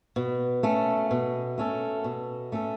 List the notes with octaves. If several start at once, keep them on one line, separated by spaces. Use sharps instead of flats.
B2
A3 C#4 A4
B2
A3 C#4 A4
B2
A3 C#4 A4